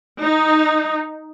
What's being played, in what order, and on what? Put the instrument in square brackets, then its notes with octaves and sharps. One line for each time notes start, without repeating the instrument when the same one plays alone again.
[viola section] D#4